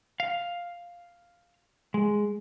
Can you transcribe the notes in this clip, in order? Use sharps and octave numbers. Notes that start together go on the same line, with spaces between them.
F5
G#3